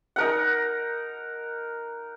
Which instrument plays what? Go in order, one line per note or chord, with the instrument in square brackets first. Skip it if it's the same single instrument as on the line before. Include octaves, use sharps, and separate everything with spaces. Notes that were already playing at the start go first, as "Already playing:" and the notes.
[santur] D#4 A#4 F#5